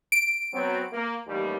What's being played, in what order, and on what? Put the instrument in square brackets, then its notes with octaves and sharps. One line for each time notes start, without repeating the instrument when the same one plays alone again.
[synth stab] D7
[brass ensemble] F#3 B3 C4
A#3
A1 D#2 G3